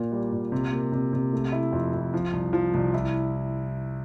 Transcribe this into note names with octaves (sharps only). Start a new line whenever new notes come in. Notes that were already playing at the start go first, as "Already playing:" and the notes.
Already playing: A#2 A#3
G3
A#2
C3
A#3
C3
C3
A3
E4
F2
F2
F3
C2
F3
C2
E4